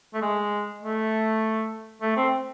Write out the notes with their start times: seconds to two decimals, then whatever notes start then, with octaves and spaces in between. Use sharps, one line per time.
0.14 A3
0.22 G#3
0.83 A3
2.02 A3
2.17 C4